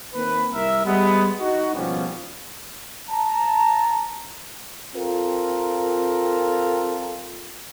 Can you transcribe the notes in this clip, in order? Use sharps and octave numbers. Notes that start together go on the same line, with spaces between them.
D#3 A#3 C4 B4
C2 A#4 E5
G3 G#3 B3
D#4 F#4
G#1 B2 F3 G3 B3 C#4
A5 A#5
C4 F4 A4 A#4